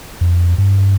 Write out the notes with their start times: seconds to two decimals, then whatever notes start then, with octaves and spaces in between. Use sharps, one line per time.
0.21 F2
0.58 G2